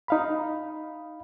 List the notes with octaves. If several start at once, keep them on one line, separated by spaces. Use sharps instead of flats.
D#4 F5 B5